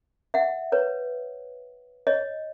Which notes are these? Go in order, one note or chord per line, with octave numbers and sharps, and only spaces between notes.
E5 F#5
B4 C#5
C#5 D#5